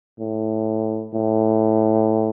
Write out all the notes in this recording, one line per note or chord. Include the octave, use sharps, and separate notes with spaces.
A2
A2